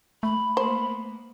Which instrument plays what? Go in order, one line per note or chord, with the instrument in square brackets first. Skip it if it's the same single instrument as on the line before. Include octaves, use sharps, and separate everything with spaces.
[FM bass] A3 [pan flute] B5
[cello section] A#3 B3 [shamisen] C5